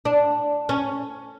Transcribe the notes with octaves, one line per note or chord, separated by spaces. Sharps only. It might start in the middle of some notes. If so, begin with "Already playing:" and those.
D4
C#4